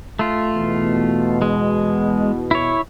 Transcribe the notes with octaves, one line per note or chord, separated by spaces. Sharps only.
A3 F4
E2 B2
G#3
E4 C#5